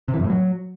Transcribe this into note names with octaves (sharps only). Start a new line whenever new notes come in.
C3
E3
F#2
A2
F#3